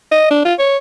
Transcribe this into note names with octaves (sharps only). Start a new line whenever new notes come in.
D#5
D4
F4
C#5